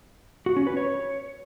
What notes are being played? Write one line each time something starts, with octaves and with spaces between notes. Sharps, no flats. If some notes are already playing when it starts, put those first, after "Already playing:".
F#4
C#4
B4
C#5